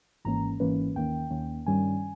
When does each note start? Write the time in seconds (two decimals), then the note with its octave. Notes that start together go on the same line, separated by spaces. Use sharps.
0.25 G#1 G#2 E3 A#3 C#4 A#5
0.60 G#1 G#2 E3 A#3 C#4 B4
0.95 D#2 D#3 A#3 C#4 G5
1.30 D#2 D#3 A#3 C#4
1.66 G2 D#3 G3 C#4 G#5